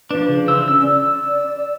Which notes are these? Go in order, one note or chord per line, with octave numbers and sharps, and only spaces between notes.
F3 D4 B4
C#3
E3 C5 E6
C#4 E6
D5